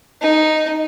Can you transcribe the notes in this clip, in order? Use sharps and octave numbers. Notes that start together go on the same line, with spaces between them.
D#4